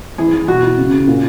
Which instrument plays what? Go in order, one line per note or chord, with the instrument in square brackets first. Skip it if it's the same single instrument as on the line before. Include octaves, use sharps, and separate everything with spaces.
[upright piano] E3 [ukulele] G#4
[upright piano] E3
[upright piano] B2 [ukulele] F#4
[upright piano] E4
C#3
C#3
A#2